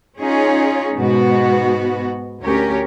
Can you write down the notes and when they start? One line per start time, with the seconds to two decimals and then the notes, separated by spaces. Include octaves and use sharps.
0.20 C#4 D#4 F4 G#4 C#5
0.96 G#2 B2 B3 F#4
2.42 D2 C#4 G4 A#4 C#5